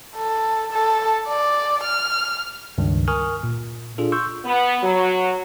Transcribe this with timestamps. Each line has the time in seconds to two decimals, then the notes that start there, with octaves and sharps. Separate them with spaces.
0.17 A4
0.72 A4
1.28 D5
1.84 F6
2.78 C#2 G2 D#3
3.08 A#4 G#5 C#6 D#6 F6
3.43 A#2
3.98 D4 F4 G#4 A4
4.12 C6 C#6 E6 G6
4.44 B3
4.83 F#3